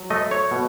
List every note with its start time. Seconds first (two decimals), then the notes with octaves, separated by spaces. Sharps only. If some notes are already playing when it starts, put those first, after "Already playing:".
Already playing: F#3
0.10 A3 D#5
0.31 C#5
0.51 B2